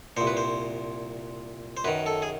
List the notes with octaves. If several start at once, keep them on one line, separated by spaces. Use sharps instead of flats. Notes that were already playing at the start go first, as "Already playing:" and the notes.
C2 A#2 C5
B4
C5
C5
F#2 D#3 B4
A4
G#4